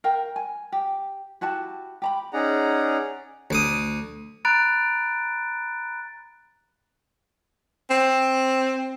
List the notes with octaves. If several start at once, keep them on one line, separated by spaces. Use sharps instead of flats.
A#4 F5 G5
G#5
G4
E4 F#4 G4 A5
G4 A#5 B5
C#4 D#4 G#4 D5 F#5 A#5
D2 D6 D#6
A#5 B5 F#6 A6 D7
C4